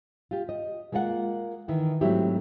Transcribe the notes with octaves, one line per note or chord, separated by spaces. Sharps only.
F4 G4
D#5
G#3 A#3 F4 A#4 F#5
D#3 E3 E4
G#2 F#3 A3 C4 E4 G4